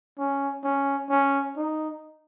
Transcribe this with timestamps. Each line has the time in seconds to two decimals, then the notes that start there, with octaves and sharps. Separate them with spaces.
0.19 C#4
0.64 C#4
1.10 C#4
1.57 D#4